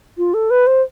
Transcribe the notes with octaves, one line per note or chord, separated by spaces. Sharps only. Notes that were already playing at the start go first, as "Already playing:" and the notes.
F4
A4
B4
C5